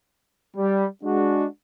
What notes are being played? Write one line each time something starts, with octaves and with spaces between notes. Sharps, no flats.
G3
G#3 D4 F#4